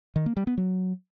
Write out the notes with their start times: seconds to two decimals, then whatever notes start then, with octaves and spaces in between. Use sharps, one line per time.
0.16 D#3
0.26 A#3
0.37 G3
0.47 B3
0.58 F#3